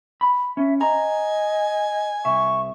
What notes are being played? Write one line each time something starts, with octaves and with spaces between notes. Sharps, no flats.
B5
C#4 E5
D#5 G#5 A#5
C2 E5 C#6